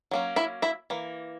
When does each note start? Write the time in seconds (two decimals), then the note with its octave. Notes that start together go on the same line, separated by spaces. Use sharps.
0.11 F#3 A#3 C#4
0.36 E4 E5
0.62 E4 E5
0.90 E3 A#3